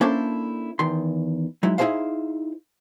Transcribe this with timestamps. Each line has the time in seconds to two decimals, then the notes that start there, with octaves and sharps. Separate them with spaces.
0.01 A#3 C#4 D4 E4 A4 C5
0.79 E2 D#3 C6
1.63 F#3 G#3 D#4 E4
1.78 D#4 E4 F#4 G#4 C5 F5